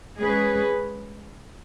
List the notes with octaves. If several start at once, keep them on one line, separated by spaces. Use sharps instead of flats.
G#3 C#4 G#4 B4